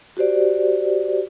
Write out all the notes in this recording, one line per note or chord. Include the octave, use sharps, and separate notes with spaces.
F#4 G4 C5 D5